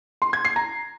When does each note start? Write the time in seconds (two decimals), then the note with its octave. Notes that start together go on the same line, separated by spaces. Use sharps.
0.22 C6
0.33 G#6
0.45 C7
0.56 A#5